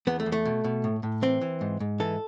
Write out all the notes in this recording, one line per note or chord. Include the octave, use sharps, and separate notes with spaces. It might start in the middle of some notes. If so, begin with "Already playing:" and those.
E2 B3
A3
E2
A3
B2
B2
A2
A2
E3 C4
E3
G#2
G#2
E3 A4